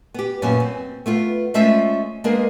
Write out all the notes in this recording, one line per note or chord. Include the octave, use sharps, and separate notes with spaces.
B3 G4
F#2 A#2 B3 C#4
C4
A3 B3 F4
G#3 A3 C#4 F4 C5 E5
G#3 A#3 B3 D4 G#4 A#4